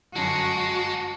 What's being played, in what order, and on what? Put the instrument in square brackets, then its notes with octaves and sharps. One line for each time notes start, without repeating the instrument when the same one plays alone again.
[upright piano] G1 F#2 F#3 [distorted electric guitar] G#3 [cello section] F#4 [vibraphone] A5